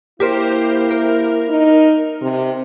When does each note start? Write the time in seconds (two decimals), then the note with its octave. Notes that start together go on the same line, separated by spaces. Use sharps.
0.20 A#3 E4 G4 A#4 C5
0.91 A#4
1.50 D#4
2.22 C3